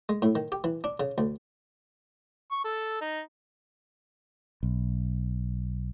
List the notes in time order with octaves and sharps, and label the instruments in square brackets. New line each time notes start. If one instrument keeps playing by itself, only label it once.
[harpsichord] G#3
A2
D#3
G4
E3
D4
C#3
D2
[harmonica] C#6
A4
D#4
[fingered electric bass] B1